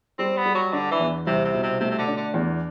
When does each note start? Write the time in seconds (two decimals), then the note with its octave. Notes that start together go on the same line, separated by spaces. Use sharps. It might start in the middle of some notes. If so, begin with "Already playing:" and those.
0.19 G3 C4
0.37 B3
0.46 G3
0.55 F#3
0.73 D3 D4
0.91 E3
1.00 E2
1.27 C2 C3
1.45 C3
1.54 B2
1.63 C3
1.80 C3 A3
1.90 C3
1.98 D3
2.08 D4
2.17 D3
2.34 E2